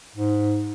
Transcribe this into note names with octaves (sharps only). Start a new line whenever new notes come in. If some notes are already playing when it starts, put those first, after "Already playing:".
G#2